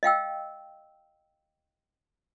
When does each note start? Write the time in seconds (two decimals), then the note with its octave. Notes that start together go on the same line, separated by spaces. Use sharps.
0.03 D#5 F5 G5 E6